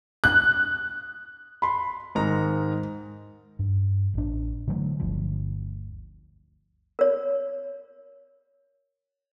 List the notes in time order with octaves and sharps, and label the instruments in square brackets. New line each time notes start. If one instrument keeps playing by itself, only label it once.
[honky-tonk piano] F#6
[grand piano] B5 C6
G#2 D#3 A#5
[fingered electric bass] G2
A1 D4
D3 E3 F#3 A3
G1 D2 F3
[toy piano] A#4 C#5